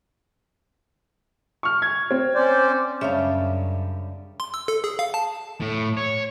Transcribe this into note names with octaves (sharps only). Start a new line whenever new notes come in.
C#6 F6
G#6
C4
C#4 C5 D5
F#2 C#3 G3 C#4 D4 E5 F5
C6
E6
A4
G#4
F5
A5
A2
C#5